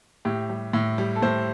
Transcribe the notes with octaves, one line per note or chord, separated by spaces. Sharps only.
A2 G4
G3
A2
G3
A4
A2 C5